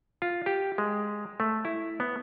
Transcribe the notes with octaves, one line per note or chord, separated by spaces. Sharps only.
F4
G4
G#3
A3
E4
B3